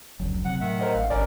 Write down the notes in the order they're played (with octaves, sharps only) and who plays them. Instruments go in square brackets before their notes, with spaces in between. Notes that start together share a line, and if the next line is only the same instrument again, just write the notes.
[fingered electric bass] F1 C#2 [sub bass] F#3
[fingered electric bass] C3 [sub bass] F#3 [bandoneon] F#5
[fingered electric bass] A2 [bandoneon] D#3 E5 F#5
[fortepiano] A#4 C5 D#5
[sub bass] A1 [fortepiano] F5
[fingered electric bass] G1 [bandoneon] C#4 A#4 [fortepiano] D5